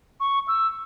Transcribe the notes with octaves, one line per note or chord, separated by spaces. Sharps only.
C#6
E6